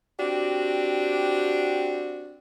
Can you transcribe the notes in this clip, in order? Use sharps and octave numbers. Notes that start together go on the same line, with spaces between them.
C4 D4 F#4 G4